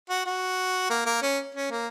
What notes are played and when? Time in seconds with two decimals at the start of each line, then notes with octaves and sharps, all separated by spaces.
0.10 F#4
0.26 F#4
0.90 A#3
1.06 A#3
1.22 C#4
1.55 C#4
1.71 A#3